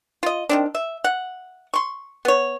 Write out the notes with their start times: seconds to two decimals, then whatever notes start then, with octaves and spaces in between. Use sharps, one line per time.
0.23 F4 D#5
0.49 D#3 C4 D4
0.75 E5
1.04 F#5
1.74 C6 C#6
2.25 B3 C#5